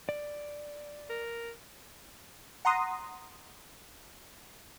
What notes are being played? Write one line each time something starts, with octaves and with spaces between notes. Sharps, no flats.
D5
A#4
F#5 A#5 C6 D#6